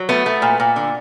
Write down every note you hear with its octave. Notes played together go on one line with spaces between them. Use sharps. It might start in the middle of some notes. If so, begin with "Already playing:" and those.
Already playing: F#3
A3 B3
A3
A#2
A#2
D3